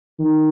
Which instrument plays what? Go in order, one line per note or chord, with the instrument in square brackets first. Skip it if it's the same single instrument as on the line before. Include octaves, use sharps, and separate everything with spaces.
[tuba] D#3